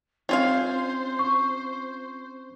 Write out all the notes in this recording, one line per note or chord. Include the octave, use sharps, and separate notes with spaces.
C4 C#4 F4 G#4 C5 F5
C#6